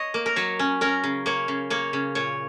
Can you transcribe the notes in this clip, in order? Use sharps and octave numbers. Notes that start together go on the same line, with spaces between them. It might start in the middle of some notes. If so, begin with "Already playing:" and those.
Already playing: C#5 D#5
A#3
A#4
F#3 C#5
C#4
C#4 A#4
C#3
A#3 C#5
C#3
A#3 C#5
C#3
A#2 C#5